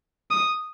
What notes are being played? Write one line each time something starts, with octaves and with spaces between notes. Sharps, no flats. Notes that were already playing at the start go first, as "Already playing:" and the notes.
D#6